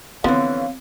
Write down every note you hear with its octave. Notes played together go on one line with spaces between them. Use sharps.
D3 E3 F3 B3 C4 C#5 F5